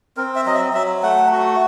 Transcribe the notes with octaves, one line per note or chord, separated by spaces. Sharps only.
C4 A#4
E5
F#3 D#5
E5
F#3 E5
A3 F#5
F#4